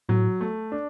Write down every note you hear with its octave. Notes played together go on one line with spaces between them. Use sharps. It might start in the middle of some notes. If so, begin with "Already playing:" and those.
A2 F#3
A3
D4